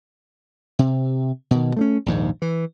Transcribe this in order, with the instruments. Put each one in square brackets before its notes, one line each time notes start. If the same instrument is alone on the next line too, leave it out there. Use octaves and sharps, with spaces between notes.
[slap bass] C3
B2 D#3
A3 C4 C#4
A#1 D#2 G#2
E3